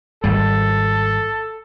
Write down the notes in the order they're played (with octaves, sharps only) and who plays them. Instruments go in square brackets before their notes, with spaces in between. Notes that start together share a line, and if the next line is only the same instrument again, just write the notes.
[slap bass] G#1 G3 [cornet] A4